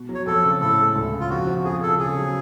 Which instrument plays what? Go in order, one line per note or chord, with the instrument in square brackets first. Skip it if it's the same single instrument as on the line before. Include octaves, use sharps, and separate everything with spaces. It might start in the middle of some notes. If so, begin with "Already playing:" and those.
Already playing: [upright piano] B2
F#3
[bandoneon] C#5
[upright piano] F2 [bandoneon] A4
[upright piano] C#3
[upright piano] A2 [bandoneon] A4
[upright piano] G#3
D2
C#3
[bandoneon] F4
[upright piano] F2 [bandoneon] F#4
[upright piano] F3
[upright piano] F2 [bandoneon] G#4
[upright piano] C#3 [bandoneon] A4
[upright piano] C#3 [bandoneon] G#4
[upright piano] F#3